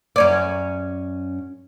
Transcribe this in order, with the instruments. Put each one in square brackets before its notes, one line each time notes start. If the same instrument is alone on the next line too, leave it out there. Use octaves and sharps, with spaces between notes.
[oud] F#2 C#4 D5